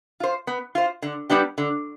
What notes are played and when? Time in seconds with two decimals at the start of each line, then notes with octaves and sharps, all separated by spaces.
0.20 F4 C5
0.47 B3
0.75 F4 C5
1.02 D3
1.30 G3 B3 D4 G4
1.58 D3